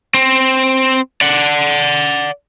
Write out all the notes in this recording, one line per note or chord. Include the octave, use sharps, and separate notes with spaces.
C4
D5 F#5